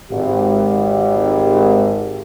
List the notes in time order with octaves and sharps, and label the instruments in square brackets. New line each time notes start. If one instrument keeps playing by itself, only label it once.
[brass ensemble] G#1 [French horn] G4